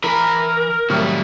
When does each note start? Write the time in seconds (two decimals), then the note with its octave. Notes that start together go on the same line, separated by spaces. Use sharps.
0.04 E3 E4 A#4 B5
0.90 A2 C3 D#3 F#3 G3